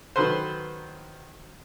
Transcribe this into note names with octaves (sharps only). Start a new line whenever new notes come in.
D#3 F#3 A4 B4 C5